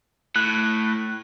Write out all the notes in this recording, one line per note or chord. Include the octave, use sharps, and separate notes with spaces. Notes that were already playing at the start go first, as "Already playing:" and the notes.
A2 F#6